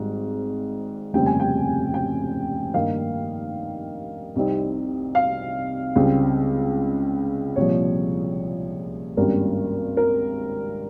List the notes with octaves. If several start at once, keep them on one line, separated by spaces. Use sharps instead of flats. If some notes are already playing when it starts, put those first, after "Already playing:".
Already playing: G#1 G#2 G3
F1 D#2 C#3 G3 C4 G5
G#5
G5
G5
G2 D#3 A#3 D#4 F5
C2 C3 G3 C4 D#4
F5
C#2 C#3 G3 C4
C2 A#2 F3 C#5
G#1 G2 G3 A#3 C#4 A#4
A#4